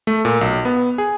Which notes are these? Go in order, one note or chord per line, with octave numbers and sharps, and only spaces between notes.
A3
A#2
B1
B3
G#4